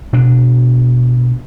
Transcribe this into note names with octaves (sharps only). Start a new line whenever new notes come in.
B2 D4